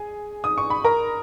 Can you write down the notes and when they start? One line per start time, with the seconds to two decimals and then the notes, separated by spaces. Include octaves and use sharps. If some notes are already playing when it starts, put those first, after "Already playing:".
Already playing: G#4 G#5
0.44 D#6
0.58 C#6
0.70 B5
0.84 A#4 A#5